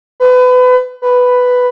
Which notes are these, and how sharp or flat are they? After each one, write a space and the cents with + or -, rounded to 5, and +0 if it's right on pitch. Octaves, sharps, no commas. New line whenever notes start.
B4 +30
B4 +5